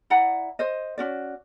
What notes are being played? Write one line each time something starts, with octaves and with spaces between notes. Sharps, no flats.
E4 D5 F#5 A#5
C5 D#5
C#4 F#4 D5